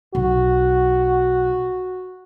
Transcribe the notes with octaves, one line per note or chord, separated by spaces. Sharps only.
B1 F#4